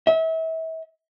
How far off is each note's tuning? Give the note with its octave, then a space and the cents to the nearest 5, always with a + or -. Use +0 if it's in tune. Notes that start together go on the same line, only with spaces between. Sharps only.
E5 -35